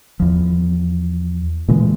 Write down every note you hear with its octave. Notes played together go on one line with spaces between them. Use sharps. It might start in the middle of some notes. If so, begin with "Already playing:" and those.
E2 F3
A#2 C#3 E3 G#3